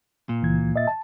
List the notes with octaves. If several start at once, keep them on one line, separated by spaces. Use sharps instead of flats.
A#2
C#2 E3 G#6
D#5 E5 A6
A5